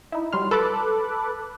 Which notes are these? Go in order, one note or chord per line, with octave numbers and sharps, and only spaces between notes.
D#4 E4
F#3 G3 C6 F6
A4 B4 B5 D6 F#6